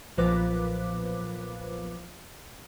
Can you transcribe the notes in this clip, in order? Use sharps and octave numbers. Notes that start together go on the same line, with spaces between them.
B1 A#2 F3 B4 D6